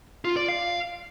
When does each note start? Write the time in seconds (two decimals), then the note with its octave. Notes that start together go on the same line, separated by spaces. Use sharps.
0.25 F4
0.36 D5
0.48 F5